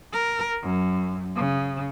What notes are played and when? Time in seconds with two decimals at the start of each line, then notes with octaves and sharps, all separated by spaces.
0.13 A#4
0.63 F#2
1.36 C#3